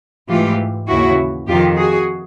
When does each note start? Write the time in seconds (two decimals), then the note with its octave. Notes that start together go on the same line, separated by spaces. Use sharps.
0.29 G#2 E3 A3 F4 G4
0.88 D#2 C#3 E3 E4 F#4
1.48 F2 C3 D#3 F4 G4
1.78 F#4 G#4